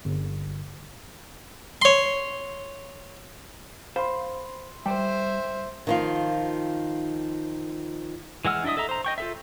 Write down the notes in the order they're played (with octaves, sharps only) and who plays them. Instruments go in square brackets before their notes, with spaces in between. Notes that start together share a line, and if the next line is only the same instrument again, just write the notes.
[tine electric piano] G1
[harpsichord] C#5 C6
[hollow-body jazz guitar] C5 F5 [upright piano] B5 C6
[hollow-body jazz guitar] G3 [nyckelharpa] C5 E5 [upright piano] G5
[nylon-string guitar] D#3 F3 F4
[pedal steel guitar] E3 G#3 F#5 E6 F6
D4 E4 D#5 E5 D#6
A4 D#5 E5 A#5
C5 A#5
D#5 G5 C#6
F4 A4 E5